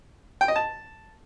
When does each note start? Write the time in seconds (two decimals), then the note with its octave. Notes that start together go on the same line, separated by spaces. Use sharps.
0.41 G5
0.48 D#5
0.56 A5